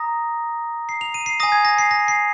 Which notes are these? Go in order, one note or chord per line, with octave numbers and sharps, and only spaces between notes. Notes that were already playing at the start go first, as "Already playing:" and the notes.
Already playing: A#5 D#6 A#6
C7
F7
D#7
C7
G#5 D#6 A#6
G#6
A#6
C7
A#6
C7